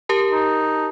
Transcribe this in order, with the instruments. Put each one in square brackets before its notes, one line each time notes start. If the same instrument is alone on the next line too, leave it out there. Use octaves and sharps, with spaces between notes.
[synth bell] G4 A#4 A5
[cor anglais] D#4